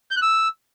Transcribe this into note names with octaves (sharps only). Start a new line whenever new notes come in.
G6
F#6
E6